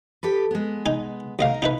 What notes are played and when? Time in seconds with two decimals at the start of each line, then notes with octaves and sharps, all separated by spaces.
0.23 G4 A4 B4
0.51 G#3 B3
0.86 D#4 G#5
1.39 D2 D#4 A#4 D#5 F5
1.62 B2 D#4 E4 B4